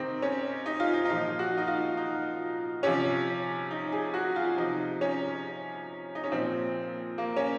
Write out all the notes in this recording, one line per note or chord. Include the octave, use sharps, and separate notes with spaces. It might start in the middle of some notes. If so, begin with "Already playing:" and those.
Already playing: C3 D#3 C4 D#4
C#4
D#4
F4
D#4
D#4
A#2 F3 F4
F#4
D#4
F4
D#4
C3 F3 C#4
D#4
G#4
F#4
F4
C3 F3 D#4
C#4
D#4
C#4
A#2 F3 C4
A#3
C#4